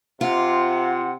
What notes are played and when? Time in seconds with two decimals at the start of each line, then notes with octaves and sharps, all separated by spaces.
0.21 C3 F4 F#5